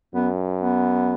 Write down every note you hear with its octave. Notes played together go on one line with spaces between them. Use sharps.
F#2 B3
B3